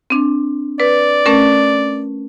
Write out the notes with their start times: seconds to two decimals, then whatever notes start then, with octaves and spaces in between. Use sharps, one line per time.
0.10 C4 D4
0.80 B4 D5
1.26 A3 C#4 A#4